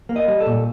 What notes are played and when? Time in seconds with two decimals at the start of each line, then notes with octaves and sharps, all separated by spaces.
0.09 A#3
0.16 D#5
0.28 G3
0.40 A4
0.47 A#2